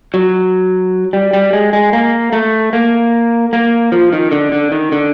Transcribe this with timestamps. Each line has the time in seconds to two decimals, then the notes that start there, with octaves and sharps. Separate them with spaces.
0.14 F#3
1.13 G3
1.33 G3
1.53 G#3
1.73 G#3
1.93 A#3
2.33 A3
2.73 A#3
3.53 A#3
3.92 F3
4.13 D#3
4.32 D3
4.52 D3
4.72 D#3
4.92 D3